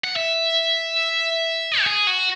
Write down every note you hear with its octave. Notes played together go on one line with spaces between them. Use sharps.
F#5
E5
F#4
G#4
F#4